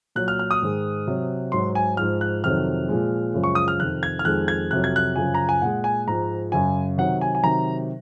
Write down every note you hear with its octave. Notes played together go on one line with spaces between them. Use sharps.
A#2 F#3 F#6
F6
F6
D#6
G#2 D#3 G#3
C3 F#3
G#2 F#3 C6
G#5
G#2 F3 G#3 F6
F#6
F2 C3 D#3 F#3 F6
A#2 F3 G#3
F#2 C#3 F3 G#3
C#6
D#6
F6
F2 C3 D#3 F#6
G#6
F6
F2 D#3 G#3 F#6
G#6
F2 C3 F#3 F#6
G#6
F#6
F#2 C#3 F3 G#5
A#5
G#5
A#2 G#3 F#5
G#5
G#2 F3 G#3 A#5
F#2 C#3 F#3 G#5
C3 D#3 F#3 F#5
G#5
G#5
C3 D#3 F#3 A#5